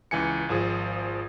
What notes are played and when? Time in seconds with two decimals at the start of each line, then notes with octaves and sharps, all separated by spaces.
0.11 C#2 E3 G#5 C#7
0.49 G#1 F3 G#4